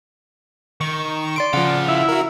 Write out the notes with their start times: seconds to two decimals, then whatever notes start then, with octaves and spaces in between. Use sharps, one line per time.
0.81 D#3 C#6
1.36 D5 C6 D7
1.53 C#3 F3 D5 F5 F#5
1.88 E4
2.09 F#4 A#4